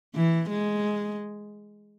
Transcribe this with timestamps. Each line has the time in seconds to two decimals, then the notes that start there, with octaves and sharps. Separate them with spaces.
0.15 E3
0.50 G#3